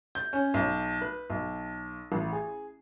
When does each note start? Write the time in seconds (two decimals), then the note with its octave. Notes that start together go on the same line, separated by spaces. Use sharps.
0.15 G6
0.33 C#4
0.54 B1
1.01 B4
1.30 B1
2.12 A1
2.32 G#4